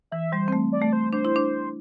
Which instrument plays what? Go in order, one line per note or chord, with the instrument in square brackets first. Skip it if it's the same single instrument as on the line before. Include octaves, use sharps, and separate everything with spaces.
[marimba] E3 [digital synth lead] E5
[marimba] G3 [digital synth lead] C5
[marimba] C4
A3
[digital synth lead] D5
[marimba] A3
[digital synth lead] C5
[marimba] D4 [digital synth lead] C5
[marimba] E4
D4